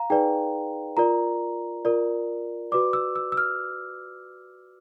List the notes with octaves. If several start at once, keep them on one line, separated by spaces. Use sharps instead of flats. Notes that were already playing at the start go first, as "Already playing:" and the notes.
Already playing: F5 A#5
D#4 G#4 B4 D5 G5
F4 A#4 D5 A#5
F4 A#4 D5
F#4 B4 D5 D6
E6
E6
E6
F6